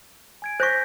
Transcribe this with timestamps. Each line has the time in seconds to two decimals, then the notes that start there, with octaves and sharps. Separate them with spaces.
0.42 G#5 G#6 D7
0.60 C5 C#6 G6 A#6 B6